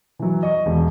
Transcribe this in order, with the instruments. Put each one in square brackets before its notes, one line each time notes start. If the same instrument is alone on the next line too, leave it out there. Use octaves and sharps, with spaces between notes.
[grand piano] E3 F#3
D#5 C#6
E1